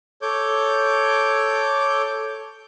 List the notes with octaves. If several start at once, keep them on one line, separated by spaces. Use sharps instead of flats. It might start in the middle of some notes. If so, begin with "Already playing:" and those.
A4 C#5 D6 G6